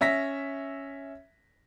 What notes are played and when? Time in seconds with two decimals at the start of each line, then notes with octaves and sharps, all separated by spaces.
0.01 C#4 E5 A#6 B6